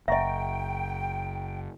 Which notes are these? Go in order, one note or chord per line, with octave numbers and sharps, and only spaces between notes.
F#1 D#5 E5 F#5 G5 A#5 C#6